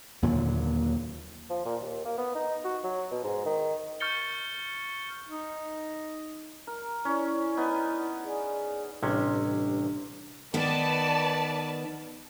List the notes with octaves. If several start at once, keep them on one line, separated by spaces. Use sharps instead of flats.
D#2 A#2 D3 F#3
F3
A#2
D#2
A#3
B3
D#4
F#4
F#3
B2
G#2
D#3
C#6 F6 G6 A6 C#7 G7
D#4
A#4
C#4 E4 C#5 D5
B3 D#4
G#4 D5 G#5
A1 G2 C3 C#4
D#3 B3 B4 D5 A5